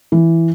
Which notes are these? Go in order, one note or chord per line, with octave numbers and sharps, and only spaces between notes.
E3